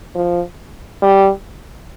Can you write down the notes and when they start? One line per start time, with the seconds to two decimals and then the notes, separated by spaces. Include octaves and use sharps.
0.15 F3
1.02 G3